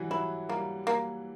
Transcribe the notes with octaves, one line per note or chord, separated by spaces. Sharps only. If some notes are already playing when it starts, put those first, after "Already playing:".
Already playing: E3 F#3 G3
F#3 E4
G3 A#3
A#3